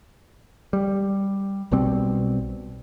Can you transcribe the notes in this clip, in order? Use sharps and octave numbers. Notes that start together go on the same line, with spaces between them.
G3
B1 B2 G3 C4